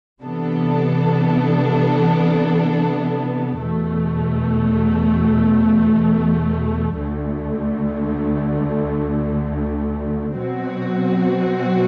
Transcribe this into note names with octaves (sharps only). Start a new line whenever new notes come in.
C3 E3 B3 D4 A4
E2 B2 A3
D2 D3 A3
B2 F#3 C4 F#4